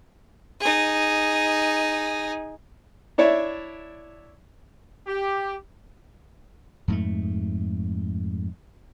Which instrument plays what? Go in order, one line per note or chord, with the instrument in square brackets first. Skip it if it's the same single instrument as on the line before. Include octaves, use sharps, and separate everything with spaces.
[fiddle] D#4 G#4
[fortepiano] D4 E4 C#5 D5 E5
[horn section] G4
[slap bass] F2 G#2 A3